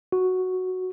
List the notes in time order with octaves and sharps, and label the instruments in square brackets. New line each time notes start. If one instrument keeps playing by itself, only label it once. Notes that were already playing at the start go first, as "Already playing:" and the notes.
[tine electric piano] F#4